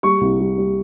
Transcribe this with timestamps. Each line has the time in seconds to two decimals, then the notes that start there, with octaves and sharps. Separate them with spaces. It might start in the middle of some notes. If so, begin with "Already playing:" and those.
0.03 G3 C#6
0.21 C2
0.40 G3
0.58 G3